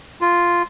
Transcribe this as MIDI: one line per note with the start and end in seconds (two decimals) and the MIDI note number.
0.21 0.62 65